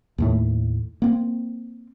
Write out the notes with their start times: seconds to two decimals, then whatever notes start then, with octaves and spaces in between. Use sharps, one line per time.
0.18 D#2 A2 A3
1.02 A#3 C4